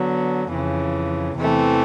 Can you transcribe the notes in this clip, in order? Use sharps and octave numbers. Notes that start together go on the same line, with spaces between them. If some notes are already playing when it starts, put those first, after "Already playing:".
Already playing: D3 F#3 B3
F2 C#3 E3
E2 C3 E3 A3 C4